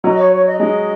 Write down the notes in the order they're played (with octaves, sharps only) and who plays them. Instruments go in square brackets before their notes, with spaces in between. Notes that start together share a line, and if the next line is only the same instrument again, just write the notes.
[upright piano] F#3 [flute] D#5
[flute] C#5
C#5
D#5
[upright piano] G#3 [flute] D#5